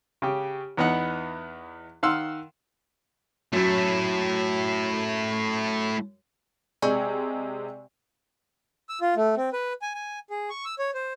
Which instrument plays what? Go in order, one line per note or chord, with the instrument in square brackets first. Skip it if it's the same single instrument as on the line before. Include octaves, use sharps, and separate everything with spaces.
[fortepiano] C#3 G4
E2 B3 D#4 F#5
D#3 F5 F#5 C6 E6
[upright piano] F#2 F#3 [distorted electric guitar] A3 E4
[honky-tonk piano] C3 G#3 G#4 [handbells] D5 G#5 C#6
[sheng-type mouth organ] E6
F4
A3
C4
B4
G#5
G#5
G#4
C#6
E6
C#5
C5